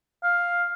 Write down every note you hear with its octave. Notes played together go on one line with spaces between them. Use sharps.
F5